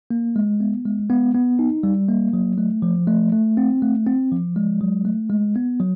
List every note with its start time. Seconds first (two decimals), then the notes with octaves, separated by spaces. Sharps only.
0.10 A#3
0.36 G#3
0.60 B3
0.85 G#3
1.10 B3
1.34 B3
1.59 D#4
1.83 G3
2.08 A#3
2.33 F#3
2.58 A3
2.82 F3
3.07 A3
3.32 A3
3.57 C4
3.82 A3
4.07 C4
4.32 F3
4.56 G#3
4.81 F#3
5.05 A3
5.30 G#3
5.56 B3
5.80 F#3